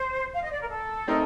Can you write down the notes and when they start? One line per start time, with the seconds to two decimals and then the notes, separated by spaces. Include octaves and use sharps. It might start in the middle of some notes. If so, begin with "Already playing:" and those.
Already playing: C5
0.33 F5
0.43 D#5
0.51 D5
0.61 A#4
0.70 A4
1.08 A3 C4 D#4 A#4 D#5